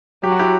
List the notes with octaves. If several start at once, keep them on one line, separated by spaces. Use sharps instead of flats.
F#3 G4
F#4
E4 G4